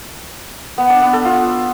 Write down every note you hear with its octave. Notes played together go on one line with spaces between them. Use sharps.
B3
D4
B3
A4
F4